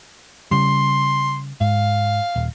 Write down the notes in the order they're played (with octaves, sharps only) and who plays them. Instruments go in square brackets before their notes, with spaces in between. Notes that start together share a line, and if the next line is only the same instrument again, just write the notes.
[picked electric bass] C#3 G3 [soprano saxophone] C6
[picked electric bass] G#2 [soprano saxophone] F5
[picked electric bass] D#1